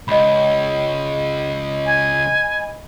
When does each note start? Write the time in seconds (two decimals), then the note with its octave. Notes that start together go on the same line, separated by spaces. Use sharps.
0.08 C#2 D#5 B5
1.86 G#5